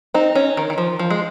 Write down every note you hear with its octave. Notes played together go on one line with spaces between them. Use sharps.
C4 D#4
C#4
D#3
D#3
F3
F3
G#3